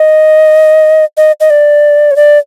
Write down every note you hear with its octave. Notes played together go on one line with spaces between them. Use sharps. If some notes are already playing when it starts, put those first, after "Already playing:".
Already playing: D#5
D#5
D#5
D5
C#5
D5